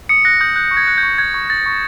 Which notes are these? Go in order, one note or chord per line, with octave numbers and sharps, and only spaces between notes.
D#6 C#7
F#6 A#6
D#6 G6
F#6 G6
C#6
G#6
F#6
G6
C#6
F#6 G#6
C#6
F#6 A6
C#6